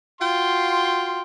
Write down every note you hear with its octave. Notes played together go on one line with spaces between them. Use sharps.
F4 F#4 F5 G5 C6